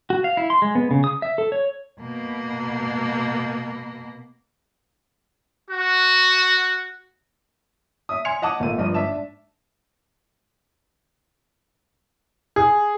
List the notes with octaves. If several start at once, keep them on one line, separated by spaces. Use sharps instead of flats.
F#4
F5
E4
C6
G#3
B3
C#3
D#6
E5
A4
C#5
B2 A#3
F#4
E5 D#6
G#5 C6 G#6 C#7 F7
D#5 F#5 A5 D6 D#6
G#1 A#2 A3 F5 D#7
G1 G2 F3 D4 D#5 D#7
G#2 D4 E5 A5 E7
G#4